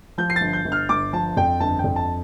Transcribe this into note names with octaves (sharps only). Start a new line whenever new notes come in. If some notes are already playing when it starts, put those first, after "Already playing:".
F3 G6
C7
A6
G1
G6
G1
F6
G1 D6
F3 A5
F2 G5
G1 A5
G5
F2
A5